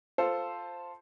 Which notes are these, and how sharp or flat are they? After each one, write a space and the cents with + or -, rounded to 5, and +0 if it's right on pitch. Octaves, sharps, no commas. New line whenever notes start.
F4 +0 A4 +0 C5 +0